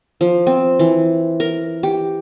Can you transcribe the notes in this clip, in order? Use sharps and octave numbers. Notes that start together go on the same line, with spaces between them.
F3
C4
E3
A#4
G4